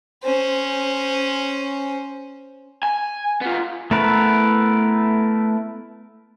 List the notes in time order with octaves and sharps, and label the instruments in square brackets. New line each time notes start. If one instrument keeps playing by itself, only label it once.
[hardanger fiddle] C#4 C5
[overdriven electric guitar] G#5
B3 F4
[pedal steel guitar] A3 B3 E4 A#4 B4